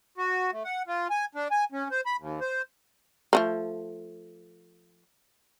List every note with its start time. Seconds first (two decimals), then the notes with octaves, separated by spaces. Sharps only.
0.18 F#4
0.52 A3
0.65 F#5
0.87 F4
1.10 G#5
1.35 D4
1.51 G#5
1.72 C#4
1.91 C5
2.06 B5
2.19 D#2
2.41 C5
3.33 F3 A3 A#3